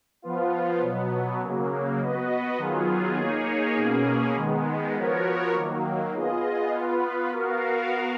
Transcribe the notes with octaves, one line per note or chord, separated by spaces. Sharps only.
F3 B3 F4
B2 F#3 B3
C#3 F#3 A#3
B3 F#4 B4 D#5
D#3 F#3 B3 F4 G#4
A#3 D#4 G#4 C#5
B2 A#3 C#4 G#4
D#3 G#3 B3
F3 B3 F#4 A#4 C#5
D#3 F#3 A#3
B3 F4 G#4 D#5
B3 F4 B4
B3 F#4 A#4 F5